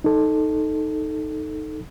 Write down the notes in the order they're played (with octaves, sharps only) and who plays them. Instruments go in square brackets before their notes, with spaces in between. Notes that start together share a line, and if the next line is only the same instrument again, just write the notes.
[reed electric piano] D#4 A4